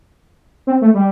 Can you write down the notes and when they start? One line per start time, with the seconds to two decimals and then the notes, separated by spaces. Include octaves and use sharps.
0.67 C4
0.81 A3
0.94 G3